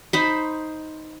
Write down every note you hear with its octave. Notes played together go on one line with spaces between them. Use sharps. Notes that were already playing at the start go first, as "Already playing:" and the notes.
D#4 C5 B5